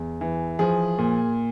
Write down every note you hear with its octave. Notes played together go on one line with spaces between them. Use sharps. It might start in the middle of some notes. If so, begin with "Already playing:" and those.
Already playing: E2
E3
F3 G#4
A#2